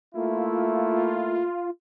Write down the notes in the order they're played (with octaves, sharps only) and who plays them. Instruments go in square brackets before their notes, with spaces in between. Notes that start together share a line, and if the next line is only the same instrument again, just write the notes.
[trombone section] A3 A#3 E4 [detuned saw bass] F4